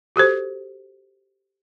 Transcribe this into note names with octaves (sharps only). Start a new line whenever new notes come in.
F#4 G4 A4 C5